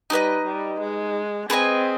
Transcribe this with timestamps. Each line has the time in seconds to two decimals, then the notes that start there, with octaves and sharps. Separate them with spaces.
0.10 G3 D#4 G#4 B4 D#5
0.45 G3
0.81 G#3
1.50 C4 G#4 B4 D#5 G#5